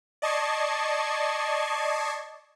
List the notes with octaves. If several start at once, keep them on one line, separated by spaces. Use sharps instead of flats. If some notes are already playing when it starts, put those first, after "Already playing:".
D5 D#5 A5 C#6 G#6 C7